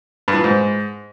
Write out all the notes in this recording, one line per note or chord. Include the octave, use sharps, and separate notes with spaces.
G2
E3
A#2
G#2